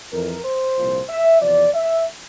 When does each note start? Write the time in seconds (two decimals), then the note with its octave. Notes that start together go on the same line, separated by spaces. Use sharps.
0.12 F2 E3 A#4
0.44 C5
0.77 C2 A#2 F3
1.09 E5
1.41 E2 C3 F3 D5
1.74 E5